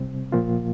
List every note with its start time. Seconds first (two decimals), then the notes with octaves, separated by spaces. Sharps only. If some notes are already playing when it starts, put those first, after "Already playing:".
Already playing: C3 G3 C4
0.32 A#2 F3 A#3 F4